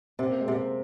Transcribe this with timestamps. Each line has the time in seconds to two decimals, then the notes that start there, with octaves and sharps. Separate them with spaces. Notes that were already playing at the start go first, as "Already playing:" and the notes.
0.19 C3 C4
0.30 A#3
0.40 G#3
0.48 C3 A#3